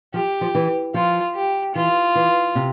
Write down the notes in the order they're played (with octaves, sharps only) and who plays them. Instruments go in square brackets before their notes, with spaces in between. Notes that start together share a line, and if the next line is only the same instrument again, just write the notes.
[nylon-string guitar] F3 [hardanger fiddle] G4
[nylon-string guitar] F3
E3
[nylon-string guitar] F3 [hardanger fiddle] F4
[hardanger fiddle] G4
[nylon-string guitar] E3 [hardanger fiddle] F4
[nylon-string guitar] E3
C3